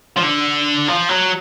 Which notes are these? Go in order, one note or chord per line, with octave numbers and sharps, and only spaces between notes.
F3
D3
F3
F#3